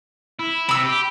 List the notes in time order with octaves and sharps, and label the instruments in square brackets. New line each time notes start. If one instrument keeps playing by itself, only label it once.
[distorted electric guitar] E4
[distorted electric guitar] C3 [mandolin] B5 E6
[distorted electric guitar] G4